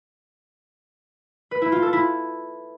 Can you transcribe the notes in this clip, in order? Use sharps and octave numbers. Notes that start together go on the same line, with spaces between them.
B4
E4
F4
A4
E4